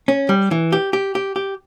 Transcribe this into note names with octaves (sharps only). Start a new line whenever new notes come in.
C#4
G3
E3
G4
G4
G4
G4